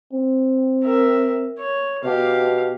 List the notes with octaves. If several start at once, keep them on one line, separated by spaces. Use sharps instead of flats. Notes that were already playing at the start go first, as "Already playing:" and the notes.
C4
A#4 E5
C#5
B2 G4 F5